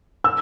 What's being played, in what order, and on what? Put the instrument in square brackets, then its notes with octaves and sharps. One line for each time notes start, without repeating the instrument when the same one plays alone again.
[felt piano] E6